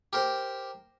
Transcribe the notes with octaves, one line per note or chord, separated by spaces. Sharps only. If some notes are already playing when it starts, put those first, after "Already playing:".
G4 A#4 C5